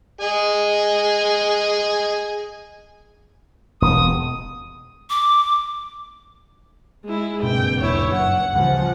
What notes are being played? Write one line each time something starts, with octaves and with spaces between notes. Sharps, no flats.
G#4 D#5 G#5
E1 D#6
D6
G#3 E4
F#1 G2 B2 C4 G5
D#1 E4 C#5
F#2 F#5
D1 C#3 F3 G3 F#5